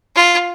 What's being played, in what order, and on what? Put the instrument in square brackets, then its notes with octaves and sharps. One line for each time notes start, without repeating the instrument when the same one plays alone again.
[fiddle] F4